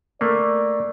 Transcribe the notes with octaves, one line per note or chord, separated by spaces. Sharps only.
A3 A#3 D5